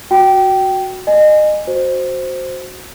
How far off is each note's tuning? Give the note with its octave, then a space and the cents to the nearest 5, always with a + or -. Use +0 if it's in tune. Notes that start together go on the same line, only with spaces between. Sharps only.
F#4 +0 G5 -15
D#5 -30 G#5 +0
F#4 +0 C5 +0